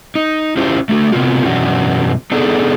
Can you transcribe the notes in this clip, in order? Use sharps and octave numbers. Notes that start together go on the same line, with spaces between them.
D#4
C#4 E4 F4 G4 C5
A3 D4 F#4
C3 B3 C4 F4 F#4
F#2 B2 E3 C#4 D4 F#4
B3 D4 D#4 G#4 A4